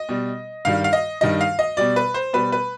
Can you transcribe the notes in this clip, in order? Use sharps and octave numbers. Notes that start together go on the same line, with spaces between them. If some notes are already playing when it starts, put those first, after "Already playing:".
Already playing: D#5
B2 G3
G2 D#3 G3 F5
F5
D#5
G2 D#3 G3 D#5
F5
D#5
B2 G3 D5
B4
C5
B2 G3 B4
B4